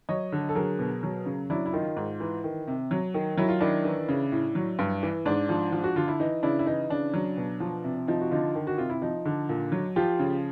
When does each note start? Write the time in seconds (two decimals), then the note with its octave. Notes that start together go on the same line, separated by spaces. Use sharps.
0.09 F#3 C#5 D#5
0.32 D3
0.49 A4
0.55 F#3 G#4 A#4
0.79 B2
1.03 F#3
1.26 C#3
1.50 F#3 D4 E4
1.66 E4
1.73 D#3 D#4 F4
1.97 G#2
2.20 E3
2.44 D#3
2.67 C3
2.91 F#3
3.14 D#3
3.38 F#3 E4
3.49 F4
3.61 D#3 D4 E4
3.85 E3
4.09 C#3
4.32 A2
4.55 F#3
4.79 G2
5.03 E3
5.26 G#2 D4
5.49 F3
5.72 F3
5.84 F#4
5.96 D3 F4
6.08 E4
6.20 E3 D#4
6.43 C#3 D4 E4
6.59 E4
6.67 E3 D#4
6.90 C#3 D4
7.14 F#3
7.37 B2
7.60 F3
7.84 C3
8.07 F3 D#4
8.21 F#4
8.31 D3 D#4 F4
8.55 D#3
8.67 F#4
8.78 C3 F4
8.90 E4
9.02 F3 D#4
9.25 D3
9.49 A#2
9.72 F#3
9.96 F3 F4 G4
10.19 C#3